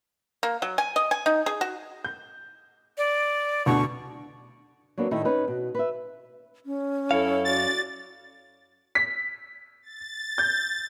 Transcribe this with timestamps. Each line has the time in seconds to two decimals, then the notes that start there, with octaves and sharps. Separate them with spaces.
0.43 A#3
0.62 F#3
0.78 G#5
0.96 D#5
1.11 G#5
1.26 D#4
1.46 G#4
1.61 F#4
2.04 G6
2.98 D5
3.66 D2 B2 D3 C#6
4.98 F#3 A#3 B3 D4
5.11 A2 D#3 A3 D#4 E4 A4
5.25 C#4 D#4 B4
5.48 B2
5.75 B4 E5
6.66 C#4
7.11 F#2 E4 A4 C#5 F5
7.45 F#4 D5 A6
8.95 B6
9.82 A6
10.38 G6